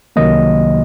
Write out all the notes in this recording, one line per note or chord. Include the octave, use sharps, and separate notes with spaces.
C2 C3 D#3 F#3 A#3 D#5